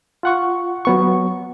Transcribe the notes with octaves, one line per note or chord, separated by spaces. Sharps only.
F4 F#5 C#6
F#3 B3 C#6